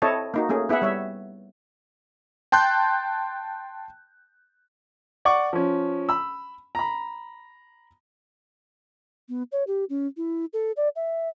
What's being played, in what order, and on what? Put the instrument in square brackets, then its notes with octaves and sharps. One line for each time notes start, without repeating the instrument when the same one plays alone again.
[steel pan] C4 E4 A4 C#5 D#5 A5
A#3 D#4 F#4
A3 A#3 C#4 G#4
B3 E4 G#4 E5 F#5
G3 C#5 E5
[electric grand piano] G5 A5 C6 F#6 G6
[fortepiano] D5 F#5 C#6 D6
F3 C#4
B5 E6
A#5 B5
[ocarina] B3
C#5
G4
C#4
E4
A4
D5
E5